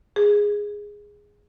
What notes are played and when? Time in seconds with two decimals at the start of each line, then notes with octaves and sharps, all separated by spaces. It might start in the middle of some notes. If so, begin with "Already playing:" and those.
0.16 G#4